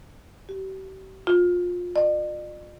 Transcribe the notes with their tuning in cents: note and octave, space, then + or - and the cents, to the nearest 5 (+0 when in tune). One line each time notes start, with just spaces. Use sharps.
G4 -40
F4 +25
D5 +45